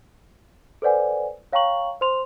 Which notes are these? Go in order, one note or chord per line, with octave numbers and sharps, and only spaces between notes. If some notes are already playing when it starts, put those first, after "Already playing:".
A4 B4 C5 D5 F#5 G#5
C#5 F5 G5 A#5 C#6 F#7
C5 C6 F7